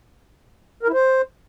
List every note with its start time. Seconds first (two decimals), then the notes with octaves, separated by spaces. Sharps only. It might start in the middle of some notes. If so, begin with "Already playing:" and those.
0.83 A#4
0.88 E4
0.94 C5